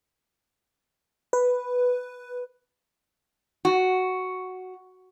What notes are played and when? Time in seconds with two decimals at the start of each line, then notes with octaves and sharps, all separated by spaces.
1.33 B4
3.65 F#4